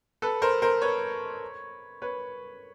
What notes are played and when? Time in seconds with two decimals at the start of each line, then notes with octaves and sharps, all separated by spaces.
0.22 A4 B4
0.42 A#4 C5
0.62 A#4 C5
0.82 B4 C#5
2.02 B4 C#5